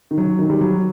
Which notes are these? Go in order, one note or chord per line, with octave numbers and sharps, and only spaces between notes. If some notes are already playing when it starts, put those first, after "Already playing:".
D#3
F#3
D#3
G3
F#3